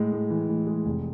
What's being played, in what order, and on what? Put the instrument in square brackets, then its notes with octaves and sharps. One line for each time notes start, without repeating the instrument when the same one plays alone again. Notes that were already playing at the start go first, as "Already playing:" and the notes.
Already playing: [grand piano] A2 G#3
A2
E3
A2
G#3
F1